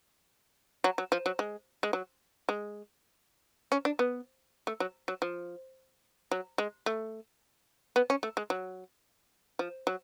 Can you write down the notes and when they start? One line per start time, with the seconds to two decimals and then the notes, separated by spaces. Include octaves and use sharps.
0.84 F#3
0.98 F#3
1.12 F3
1.26 F#3
1.39 G#3
1.83 G#3
1.93 F#3
2.49 G#3
3.72 C#4
3.85 D4
3.99 B3
4.67 A3
4.80 F#3
5.08 F#3
5.22 F3
6.31 F#3
6.58 G#3
6.86 A3
7.96 B3
8.10 C#4
8.23 A3
8.37 G#3
8.50 F#3
9.59 F3
9.87 F#3